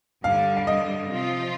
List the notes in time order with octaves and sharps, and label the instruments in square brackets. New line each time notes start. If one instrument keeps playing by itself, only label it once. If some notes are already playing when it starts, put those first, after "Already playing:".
[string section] G2 D3 G3 [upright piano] F5
[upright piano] F5
D#5
[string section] C3 F3 C4 F4